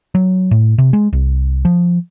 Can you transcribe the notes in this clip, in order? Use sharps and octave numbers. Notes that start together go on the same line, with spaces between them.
F#3
A2
C3
G#3
C2
F3